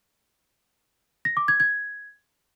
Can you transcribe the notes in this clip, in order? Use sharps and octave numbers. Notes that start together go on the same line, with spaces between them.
A#6
D6
G#6
G#6